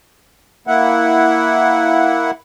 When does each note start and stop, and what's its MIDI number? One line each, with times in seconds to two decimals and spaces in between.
0.67 2.31 58
0.67 2.31 64
0.67 2.31 78